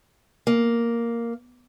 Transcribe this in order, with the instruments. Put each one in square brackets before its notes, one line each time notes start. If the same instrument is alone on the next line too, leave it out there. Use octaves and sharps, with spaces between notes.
[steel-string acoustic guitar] A#3